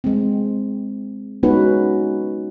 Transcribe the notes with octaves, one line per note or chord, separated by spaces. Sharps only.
G#3 C4
G#3 B3 C#4 D#4 F#4 B4